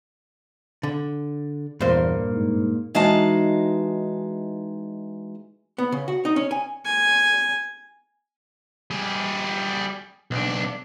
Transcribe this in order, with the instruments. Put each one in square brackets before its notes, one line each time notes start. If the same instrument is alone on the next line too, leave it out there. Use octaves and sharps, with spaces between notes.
[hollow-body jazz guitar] D3
[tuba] E2 [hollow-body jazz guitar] G2 C5 [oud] A#2
[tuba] G#2
[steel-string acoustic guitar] E3 G#3 D#4 F#4 F5 A5
[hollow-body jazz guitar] B3
C#3
F#4
D#4
C#4
G#5
[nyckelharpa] G#5
[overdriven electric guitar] G3 G#4
B1 D4